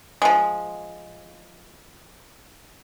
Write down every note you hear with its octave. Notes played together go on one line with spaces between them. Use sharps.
F3 G#3